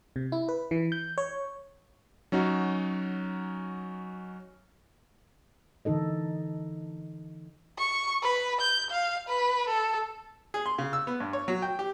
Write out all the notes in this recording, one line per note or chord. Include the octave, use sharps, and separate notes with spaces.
C3
E4
B4
E3
G6
C#5
F#3 C#4 D#4 F#4
D3 E3 D#4 A4 D#5
C#6
B4
G6
F5
B4
A4
G#4
C6
C#3
E6
B3
G2
C#5
F#3
G5
G4